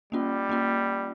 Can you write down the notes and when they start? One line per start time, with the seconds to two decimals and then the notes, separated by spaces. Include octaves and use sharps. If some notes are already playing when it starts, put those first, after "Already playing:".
0.12 G3 A#3 C#4 F4
0.49 A#3 C#4 F4